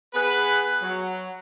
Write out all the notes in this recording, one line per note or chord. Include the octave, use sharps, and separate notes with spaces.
B3 G#4 B4
F#3